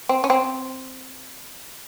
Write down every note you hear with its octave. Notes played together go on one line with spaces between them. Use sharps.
C4
C#4
C4